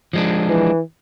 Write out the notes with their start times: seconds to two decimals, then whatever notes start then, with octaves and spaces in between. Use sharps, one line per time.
0.13 F3 G#3 D4
0.48 E3